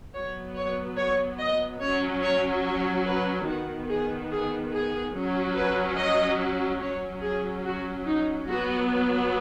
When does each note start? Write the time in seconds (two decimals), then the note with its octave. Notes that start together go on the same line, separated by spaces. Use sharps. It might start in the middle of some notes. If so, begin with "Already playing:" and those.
0.14 F#3 B3 C#5
0.56 C#5
0.97 C#5
1.39 D#5
1.80 F#3 C#4 C#5
2.22 C#5
2.64 C#5
3.06 B4
3.47 D#3 B3 F#4
3.89 G#4
4.31 G#4
4.72 G#4
5.14 F#3 C#4
5.55 B4
5.97 D#5
6.81 F#3 C#4 C#5
7.22 G#4
7.65 F#4
8.06 D#4
8.47 F#3 B3 F#4